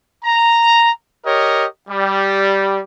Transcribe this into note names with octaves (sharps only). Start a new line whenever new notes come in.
A#5
G4 A#4 C#5 D#5
G3